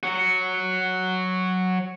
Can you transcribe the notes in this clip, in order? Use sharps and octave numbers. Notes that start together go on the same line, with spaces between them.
F#3 F#4